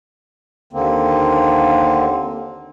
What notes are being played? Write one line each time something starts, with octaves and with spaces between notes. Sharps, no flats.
D#2 D3 A#3 C4